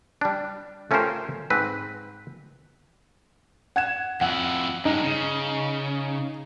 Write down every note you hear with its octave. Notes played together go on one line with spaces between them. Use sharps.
G3 D4
A3 C#4 F4 G4 A#4 C5
G#2 C4 B4
F#5 G#6 E7
F2 E4 F#5
G2 G#3 D#4
C#3